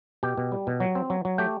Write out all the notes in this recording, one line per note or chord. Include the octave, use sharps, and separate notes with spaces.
B2 G4 G5
B2
G3
B2
F#3
C4
F#3
F#3
A3 G4 G5